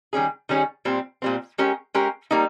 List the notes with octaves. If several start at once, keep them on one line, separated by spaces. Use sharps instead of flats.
D#3 G3 C#4 G#4
D#3 G3 C#4 G#4
A#2 G3 C4
A#2 G3 C4
G#3 C#4 G4 A#4
G#3 C#4 G4 A#4
G3 A#3 D#4